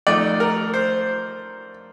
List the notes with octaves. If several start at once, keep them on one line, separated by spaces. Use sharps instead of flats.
F2 D#3 A3 D5
A#4
C5